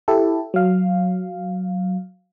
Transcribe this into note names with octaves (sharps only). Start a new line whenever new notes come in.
E4 G4 A4
F#3 F5